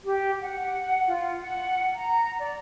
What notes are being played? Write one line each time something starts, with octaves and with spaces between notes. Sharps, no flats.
G4
F#5
F4
F#5
A#5
D5